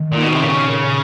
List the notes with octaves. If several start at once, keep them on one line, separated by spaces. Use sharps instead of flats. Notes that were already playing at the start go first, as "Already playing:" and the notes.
Already playing: D#3
A#2
B2 D#4
C3
A#2 C#3
A#2